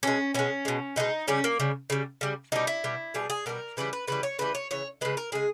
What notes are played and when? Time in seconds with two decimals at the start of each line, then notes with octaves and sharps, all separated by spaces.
0.03 B2 G#3 C#4
0.34 B2 G#3 C#4
0.65 B2 G#3
0.96 B2 G#3 D#4
1.28 C#3 G3 C#4
1.44 A#3
1.60 C#3 G3
1.90 C#3 G3
2.21 C#3 G3
2.52 B2 G3 D#4
2.67 E4
2.84 B2 G3
3.14 B2 G3 G#4
3.30 G#4
3.46 B2 G3 A#4
3.77 C#3 E3 G3 B4
3.93 B4
4.07 C#3 E3 G3 B4
4.23 C#5
4.39 C#3 E3 G3 B4
4.55 C#5
4.71 C#3 E3 C#5
5.01 C#3 G#3 B4
5.17 A#4
5.32 C#3 G#3 G#4